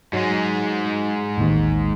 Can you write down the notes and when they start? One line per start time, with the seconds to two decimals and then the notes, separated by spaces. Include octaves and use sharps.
0.13 G#2 F#3 G#3
1.38 A1 D#2